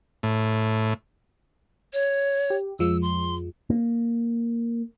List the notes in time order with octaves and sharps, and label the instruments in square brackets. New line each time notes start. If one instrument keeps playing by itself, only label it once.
[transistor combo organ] A2
[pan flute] C#5
[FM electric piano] G4
[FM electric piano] F2 F3 G#3 [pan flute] E6
[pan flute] C6
[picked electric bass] A#3